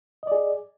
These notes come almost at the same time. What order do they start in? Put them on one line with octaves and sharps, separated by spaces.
D#5 D5 G#4